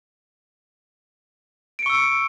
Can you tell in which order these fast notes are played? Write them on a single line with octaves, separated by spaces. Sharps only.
D7 C#7 C#6 E6